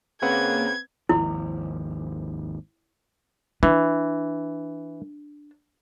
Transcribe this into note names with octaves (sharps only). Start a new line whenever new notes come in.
C#3 A#3 C4 B4 F#5 G#6
G#1 D#2 F3 E4
E3 D4